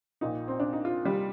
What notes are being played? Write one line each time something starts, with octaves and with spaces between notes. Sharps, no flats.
A#1 A#2 D#4
C4
D4
D#4
F4
G3